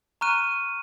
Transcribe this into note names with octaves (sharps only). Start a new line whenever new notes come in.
A#5 C#6 F6 F#6 D#7